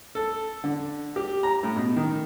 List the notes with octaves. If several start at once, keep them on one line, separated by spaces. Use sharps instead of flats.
A4
D3
G4
A#5
A2
B2
D#3